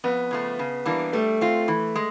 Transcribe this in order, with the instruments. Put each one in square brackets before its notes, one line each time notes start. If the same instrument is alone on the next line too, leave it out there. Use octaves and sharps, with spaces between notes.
[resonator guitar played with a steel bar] F2 [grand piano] B3
[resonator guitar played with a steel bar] C#3 F3 A3
C#3
E3 G3 A#3 D4
[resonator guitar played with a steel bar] G3 [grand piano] A3
[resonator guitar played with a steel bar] C4 F4
E3
G#3